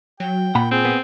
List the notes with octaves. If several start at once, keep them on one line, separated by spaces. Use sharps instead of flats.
F#3 G5
A#2 F#5 B5
C4 G#4
B3